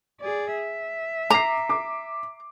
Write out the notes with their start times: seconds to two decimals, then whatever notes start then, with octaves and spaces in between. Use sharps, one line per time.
0.20 G#4 D5
0.53 E5
1.30 A#5 D6 C7
1.69 D6